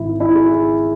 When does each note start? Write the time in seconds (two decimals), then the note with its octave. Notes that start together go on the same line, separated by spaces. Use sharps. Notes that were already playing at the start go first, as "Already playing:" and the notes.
Already playing: G#1 G#2 D#3 E4
0.20 E4
0.35 G#4